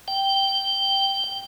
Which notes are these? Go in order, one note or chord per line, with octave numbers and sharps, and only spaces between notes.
G5